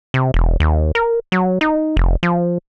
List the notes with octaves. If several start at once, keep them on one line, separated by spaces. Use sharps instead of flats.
C3
E1
D#2
A#4
F#3
D#4
F1
F3